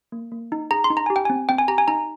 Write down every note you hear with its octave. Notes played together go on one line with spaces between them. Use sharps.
A#3
A#3
D#4
G#4 A#5
C6
D#4
A#5
G4 G#5
G5
C4 G#5
C4 G5
G#5
G4 A#5
G#5
D#4 A#5